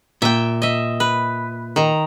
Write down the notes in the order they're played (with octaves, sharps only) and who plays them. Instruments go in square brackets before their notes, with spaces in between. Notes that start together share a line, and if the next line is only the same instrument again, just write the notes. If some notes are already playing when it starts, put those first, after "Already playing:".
[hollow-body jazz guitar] A#2 [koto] E5 G5
[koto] D#5 E5
B4
D#3 A#5